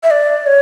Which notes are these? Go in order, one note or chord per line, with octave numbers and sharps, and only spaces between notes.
E5
D5
C#5